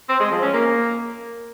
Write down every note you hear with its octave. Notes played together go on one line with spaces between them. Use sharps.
C4
G#3
F3
C#4
A#3